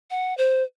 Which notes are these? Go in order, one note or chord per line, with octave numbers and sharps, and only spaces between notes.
F#5
C5